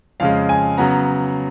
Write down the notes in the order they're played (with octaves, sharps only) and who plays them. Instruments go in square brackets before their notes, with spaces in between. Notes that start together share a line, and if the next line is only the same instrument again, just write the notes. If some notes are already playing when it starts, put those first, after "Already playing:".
[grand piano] F2 C#3 G#3 F5
G#5
C#3 F#3 B3 A#5